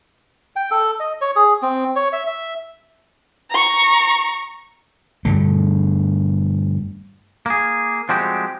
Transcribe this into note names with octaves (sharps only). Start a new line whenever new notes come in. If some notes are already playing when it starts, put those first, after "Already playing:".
G5
A4
D#5
C#5
G#4
C4
C#5
E5
E5
A#5 C#6
G2 D3 A3
A#3 G#4
F3 G3 G#3 C4 F#4 G4